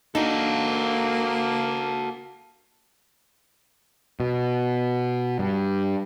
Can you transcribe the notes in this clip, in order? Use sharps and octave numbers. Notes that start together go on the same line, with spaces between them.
A#3 D4 D#4 F#4 A4
B2
G2